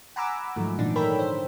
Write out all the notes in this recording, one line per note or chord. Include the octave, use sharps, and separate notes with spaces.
F#5 G#5 A#5 B5 D6 E6
G#2 D#3 F3 F#3 A3
A#2 D3 E3 D4 D#4
A4 A#4 C#5 G5 B5 E6
C5